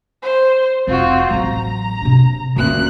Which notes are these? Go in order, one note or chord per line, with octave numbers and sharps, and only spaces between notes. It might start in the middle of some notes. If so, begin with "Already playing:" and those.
C5
F1 C4 F4 F#4
A1 F#3 A#5
C3 D4
D2 A#2 D#3 C#4 F#6